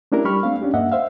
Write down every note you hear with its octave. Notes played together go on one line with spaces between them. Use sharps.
A3 C#4 D4 E4 G4 A#4
G3 G4 B5 C#6 F6
A3 C4 D4 F5
C#4 D4 G4
G2 A#3 D#5 E5 F#5
C5 E5 F5